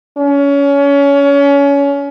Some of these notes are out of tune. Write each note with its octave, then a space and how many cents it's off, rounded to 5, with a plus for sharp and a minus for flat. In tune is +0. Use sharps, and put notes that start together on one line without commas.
C#4 +25